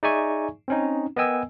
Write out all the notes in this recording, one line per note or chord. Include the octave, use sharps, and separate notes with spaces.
D#4 G#4 D5 E5 G#5 C#6
C4 C#4 D#4
B3 A#4 D#5 G5 G#5 E6